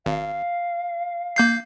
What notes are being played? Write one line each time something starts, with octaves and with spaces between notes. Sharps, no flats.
G#1 F5
A#3 G6 C7